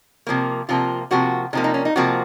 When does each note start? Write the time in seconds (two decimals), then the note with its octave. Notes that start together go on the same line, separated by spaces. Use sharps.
0.27 C3 F3 A#3
0.69 C3 F3 A#3 F4
1.11 C3 F3 A#3 F#4
1.53 C3 F3 A#3 D#4
1.64 D#4
1.74 C#4
1.85 D#4
1.96 C3 F3 A#3 F#4